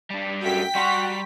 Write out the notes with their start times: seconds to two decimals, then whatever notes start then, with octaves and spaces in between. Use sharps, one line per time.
0.10 G3 D4
0.42 F#2 A3 F#4 G5 B6
0.75 G3 F#4 F#5 A#5 C6 C#6